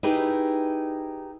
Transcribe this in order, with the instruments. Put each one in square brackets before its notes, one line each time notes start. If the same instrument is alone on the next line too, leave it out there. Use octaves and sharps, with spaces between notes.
[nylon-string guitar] D#4 E4 G4 G#4 B4